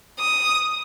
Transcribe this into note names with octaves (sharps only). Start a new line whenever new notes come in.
D#6